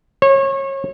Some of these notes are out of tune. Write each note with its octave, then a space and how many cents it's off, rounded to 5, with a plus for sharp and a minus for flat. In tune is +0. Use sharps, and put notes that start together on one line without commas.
C#5 -30